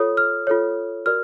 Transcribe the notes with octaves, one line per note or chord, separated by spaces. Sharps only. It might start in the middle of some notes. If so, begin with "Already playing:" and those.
Already playing: F4 A4 C#5 D#6
F6
F4 A4 C#5
F#4 A#4 D5 F6